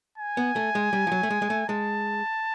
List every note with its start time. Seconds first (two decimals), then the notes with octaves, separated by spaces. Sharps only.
0.18 G#5
0.37 B3
0.56 A3
0.75 G#3
0.93 G3
1.07 F3
1.12 F#3
1.23 A3
1.30 G#3
1.42 G#3
1.50 A3
1.69 G#3 A5